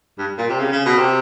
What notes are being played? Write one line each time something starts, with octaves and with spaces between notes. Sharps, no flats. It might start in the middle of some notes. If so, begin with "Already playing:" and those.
G2
A#2
C3
C#3
C#3
B2
C3